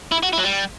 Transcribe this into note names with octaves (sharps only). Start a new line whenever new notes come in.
E4
F#4
E4
F#3
G3